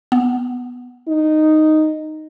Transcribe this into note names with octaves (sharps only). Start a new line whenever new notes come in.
B3
D#4